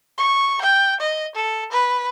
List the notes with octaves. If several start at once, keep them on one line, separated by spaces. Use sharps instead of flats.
C#6
G5
D#5
A4
B4